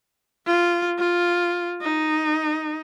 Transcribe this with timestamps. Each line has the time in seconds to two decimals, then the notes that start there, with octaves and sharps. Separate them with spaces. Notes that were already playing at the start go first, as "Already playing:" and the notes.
0.47 F4
0.99 F4
1.82 D#4